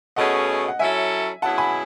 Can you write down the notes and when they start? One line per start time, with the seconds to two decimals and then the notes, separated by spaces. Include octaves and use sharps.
0.16 B2 A3 C#4 G#4 D#5 F#5
0.68 F#5
0.79 F#3 C#4 E4 A4 E5 G#5
1.42 B2 F#3 C#4 E4 G#4 F#5 A5
1.58 G#5 B5